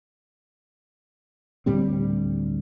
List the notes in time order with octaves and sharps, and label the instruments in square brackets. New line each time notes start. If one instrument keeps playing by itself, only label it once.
[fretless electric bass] D2 A2 G3 C4